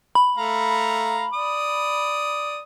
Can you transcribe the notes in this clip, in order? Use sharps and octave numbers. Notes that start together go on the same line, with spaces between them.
B5
A3 F5 A#5
D5 D#6